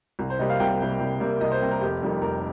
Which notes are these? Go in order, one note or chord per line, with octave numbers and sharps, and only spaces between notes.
C2
C5
C3 G3 A#3 D#5
F5
C2 G5
C3 G3 A#3
C2
C3 G3 A#3
C2 D#5
C5
C3 G3 A#3
A#4
F1 G4
F2 D#3 G3 A#3
F1 A#4